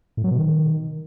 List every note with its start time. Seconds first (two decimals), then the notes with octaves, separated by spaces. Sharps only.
0.17 A2
0.24 F#3
0.31 B2
0.38 D#3